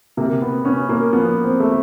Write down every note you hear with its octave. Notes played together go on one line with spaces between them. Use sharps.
C3 A#3
B3
B3 C#4
A#3
F3 B3
C4
A3